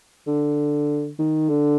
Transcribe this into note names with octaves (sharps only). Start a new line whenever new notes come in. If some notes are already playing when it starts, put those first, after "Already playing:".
D3
D#3
D3